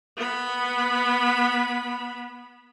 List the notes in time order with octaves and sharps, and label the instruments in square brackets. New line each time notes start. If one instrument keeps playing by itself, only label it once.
[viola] B3 B5